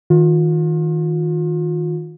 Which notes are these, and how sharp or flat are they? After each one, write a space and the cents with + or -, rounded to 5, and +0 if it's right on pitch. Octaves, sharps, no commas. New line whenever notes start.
D#3 +20 F4 +35